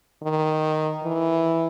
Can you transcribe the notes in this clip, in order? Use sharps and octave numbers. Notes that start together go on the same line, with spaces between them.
D#3
E3